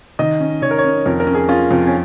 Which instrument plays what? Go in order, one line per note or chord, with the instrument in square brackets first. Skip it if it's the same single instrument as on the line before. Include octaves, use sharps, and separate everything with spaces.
[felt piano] D#3 [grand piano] D#5
[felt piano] C#4
[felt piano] D#3 [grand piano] C#5
[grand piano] A#4
C#5
[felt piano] C#4
[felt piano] F2 [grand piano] A#4
[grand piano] A#4
[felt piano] C#4
[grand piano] G#4
[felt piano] C#4 [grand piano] F4
[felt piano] F2
[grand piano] C#4